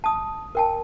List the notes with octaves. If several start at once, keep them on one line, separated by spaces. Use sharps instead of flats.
A5 D#6
A#4 G5 A5